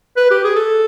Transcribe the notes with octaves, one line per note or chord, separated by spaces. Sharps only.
B4
G4
G#4
A4